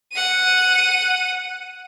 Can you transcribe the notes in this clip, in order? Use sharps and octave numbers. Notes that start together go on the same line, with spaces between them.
F#5 D#7